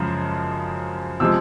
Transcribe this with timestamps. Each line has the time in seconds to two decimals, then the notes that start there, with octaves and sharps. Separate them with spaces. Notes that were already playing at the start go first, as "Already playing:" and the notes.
Already playing: F#2 C#3 F3 G#3
1.20 C3 F3 G#3 E6